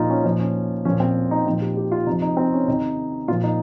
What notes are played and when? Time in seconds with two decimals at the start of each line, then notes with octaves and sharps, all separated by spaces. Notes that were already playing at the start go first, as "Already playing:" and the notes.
Already playing: A#2 F3 D#4 F4
0.10 C#4
0.24 A#2 F3 D#4
0.40 C#4
0.85 A#2 F3 C#4
1.00 C4
1.31 D#4
1.46 A#2 F3 D#4
1.61 G4
1.77 G4
1.92 F4
2.06 C3 F3 D#4
2.22 D#4
2.37 C4
2.52 C#4
2.68 C3 D#3 D#4
3.28 A#2 F3 F4
3.43 D#4